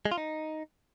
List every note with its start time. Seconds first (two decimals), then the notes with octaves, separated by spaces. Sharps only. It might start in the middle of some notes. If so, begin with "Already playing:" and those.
0.05 G#3
0.12 F4
0.18 D#4